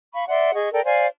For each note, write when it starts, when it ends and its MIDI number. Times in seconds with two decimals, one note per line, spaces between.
0.14 0.25 77
0.14 0.25 83
0.14 0.25 85
0.28 0.54 74
0.28 0.54 76
0.28 0.54 78
0.28 0.54 84
0.54 0.70 68
0.54 0.70 75
0.54 0.70 85
0.73 0.83 69
0.73 0.83 70
0.73 0.83 74
0.73 0.83 79
0.85 1.06 72
0.85 1.06 74
0.85 1.06 77
0.85 1.06 80